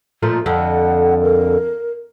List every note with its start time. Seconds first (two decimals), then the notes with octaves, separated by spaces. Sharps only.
0.23 A#2 F3 A3
0.46 F2 D3 F#5
1.22 A#4